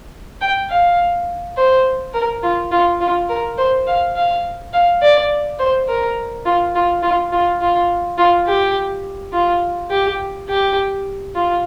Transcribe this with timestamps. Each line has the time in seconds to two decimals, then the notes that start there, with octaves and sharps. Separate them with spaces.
0.41 G5
0.70 F5
1.57 C5
2.14 A#4
2.43 F4
2.71 F4
3.00 F4
3.29 A#4
3.57 C5
3.87 F5
4.16 F5
4.73 F5
5.02 D5
5.59 C5
5.88 A#4
6.45 F4
6.75 F4
7.02 F4
7.32 F4
7.61 F4
8.18 F4
8.47 G4
9.33 F4
9.91 G4
10.49 G4
11.35 F4